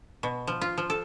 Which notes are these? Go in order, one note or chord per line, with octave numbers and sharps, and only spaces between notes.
B2
F3
F4
F3
A4